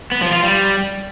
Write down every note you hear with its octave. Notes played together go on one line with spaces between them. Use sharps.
B3
F3
F4
G3